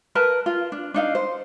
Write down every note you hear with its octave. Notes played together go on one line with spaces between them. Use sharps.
A#4 B4 A5
F4
D4
D4 D#4 F5
C5